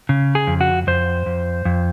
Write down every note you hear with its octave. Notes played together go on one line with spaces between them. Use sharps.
C#3
G#4
F2
F#4
F2 C5
F2
F2